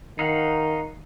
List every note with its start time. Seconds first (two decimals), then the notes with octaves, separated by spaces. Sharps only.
0.19 D#3 D#4 F5 F#5